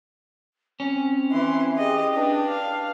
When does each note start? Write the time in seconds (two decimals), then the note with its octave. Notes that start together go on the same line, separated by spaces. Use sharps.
0.80 C4 C#4
1.32 E3 C6
1.78 G4 G#4 D#5
2.14 D4 B4
2.48 F5